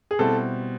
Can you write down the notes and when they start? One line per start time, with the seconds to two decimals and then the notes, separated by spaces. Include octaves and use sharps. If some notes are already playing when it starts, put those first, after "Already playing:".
0.11 G#4
0.19 B2 G3 C4 E4 A4